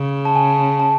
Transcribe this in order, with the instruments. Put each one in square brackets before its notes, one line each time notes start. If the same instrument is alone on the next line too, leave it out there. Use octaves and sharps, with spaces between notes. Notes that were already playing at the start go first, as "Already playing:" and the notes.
Already playing: [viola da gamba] C#3
[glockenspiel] A5
G#5
A5